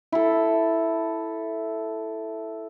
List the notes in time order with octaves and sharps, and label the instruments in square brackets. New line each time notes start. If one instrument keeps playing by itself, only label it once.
[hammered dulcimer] E4 A4